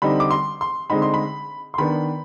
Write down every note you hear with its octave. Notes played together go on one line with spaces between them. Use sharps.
D3 G3 C4 D#4 B5
D6
C6
C6
D3 G#3 C4 D#4 B5
C6
B5
C6
D#3 B3 D4 B5